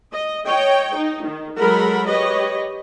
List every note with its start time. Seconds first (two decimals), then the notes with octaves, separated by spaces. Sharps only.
0.12 D#5
0.46 C#5 D#5 G5
0.96 D#4
1.26 D#3
1.60 F#3 G#3 A4 A#4 F#5 B5
2.08 G4 B4 C#5 D#5